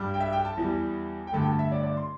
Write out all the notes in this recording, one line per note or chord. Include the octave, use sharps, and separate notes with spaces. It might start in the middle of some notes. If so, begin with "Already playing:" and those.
Already playing: G2 G3
G5
E5
G5
A5
E2 E3 G3
G5
G2 D3 A3 A5
G5
A5
E5
D5
D5
C6